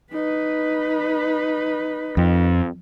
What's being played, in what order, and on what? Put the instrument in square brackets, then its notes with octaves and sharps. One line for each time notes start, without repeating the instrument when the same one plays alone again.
[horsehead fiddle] D#4 B4
[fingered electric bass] F2